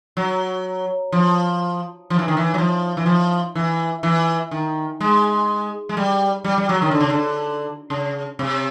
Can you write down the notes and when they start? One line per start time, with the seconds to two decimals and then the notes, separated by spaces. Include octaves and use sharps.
0.17 F#3
1.12 F3
2.10 F3
2.19 E3
2.28 D#3
2.37 E3
2.54 F#3
2.58 F3
2.97 E3
3.06 F3
3.55 E3
4.03 E3
4.51 D#3
5.01 G#3
5.89 G#3
5.97 G3
6.44 G3
6.58 G3
6.69 F#3
6.82 D#3
6.91 D3
7.01 C#3
7.10 D3
7.90 C#3
8.39 C3